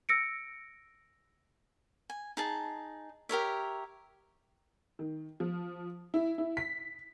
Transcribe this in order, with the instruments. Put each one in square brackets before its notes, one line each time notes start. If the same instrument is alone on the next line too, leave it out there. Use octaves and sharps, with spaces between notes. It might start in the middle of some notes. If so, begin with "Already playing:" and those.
[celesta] E6 A#6 C#7 D7
[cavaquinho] G#5
D#4 G#4 A5
G4 A#4 C#5 E5
[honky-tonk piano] D#3
F3
E4
E4
B6